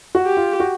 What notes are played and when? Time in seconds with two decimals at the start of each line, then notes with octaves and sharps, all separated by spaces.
0.15 F#4
0.26 G4
0.37 F4
0.60 F#4